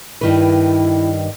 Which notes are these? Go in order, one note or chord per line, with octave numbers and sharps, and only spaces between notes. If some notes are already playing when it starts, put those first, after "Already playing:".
G2 D#3 E4 B4